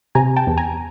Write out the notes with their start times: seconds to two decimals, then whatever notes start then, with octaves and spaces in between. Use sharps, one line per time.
0.15 C3 G#5 A#5
0.36 G5 A5
0.47 E2
0.57 G#5 A#5